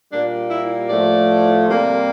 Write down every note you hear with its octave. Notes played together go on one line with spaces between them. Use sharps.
A#2 G3 A#3 D4
E4
A2 F3 A3 D5
C3 G3 A#3